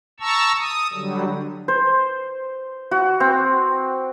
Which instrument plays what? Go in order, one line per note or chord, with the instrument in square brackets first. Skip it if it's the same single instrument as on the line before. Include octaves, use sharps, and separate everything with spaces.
[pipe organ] A5 A#5 C#6 E6
D#6
D3 F#3 G3
[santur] C5
F#4
C4